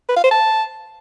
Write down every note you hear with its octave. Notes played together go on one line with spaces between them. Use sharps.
B4
F5
C5
A5